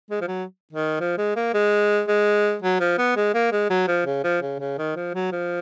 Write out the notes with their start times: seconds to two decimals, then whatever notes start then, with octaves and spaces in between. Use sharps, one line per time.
0.11 G#3
0.22 F3
0.28 F#3
0.73 D#3
1.00 F3
1.18 G#3
1.36 A#3
1.54 G#3
2.08 G#3
2.62 F#3
2.80 F3
2.98 B3
3.16 G#3
3.34 A#3
3.52 G#3
3.70 F#3
3.88 F3
4.06 C#3
4.24 F3
4.42 C#3
4.60 C#3
4.78 D#3
4.96 F3
5.14 F#3
5.32 F3